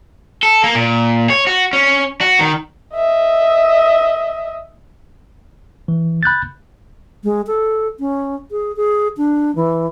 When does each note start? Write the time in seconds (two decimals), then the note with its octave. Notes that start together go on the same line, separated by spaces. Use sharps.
0.43 A4
0.64 A#3
0.75 A#2
1.30 C#5
1.47 F#4
1.73 C#4
2.21 F#4
2.39 D#3
2.95 D#5 E5
5.88 E3
6.23 B5 F#6 G6 A6
7.24 G#3
7.47 A4
8.00 C#4
8.51 G#4
8.76 G#4
9.17 D4
9.56 E3